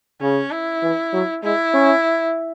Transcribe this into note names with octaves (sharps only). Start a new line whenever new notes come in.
C#3 C#4
E4
E3
F#3
G#3 E4
C#4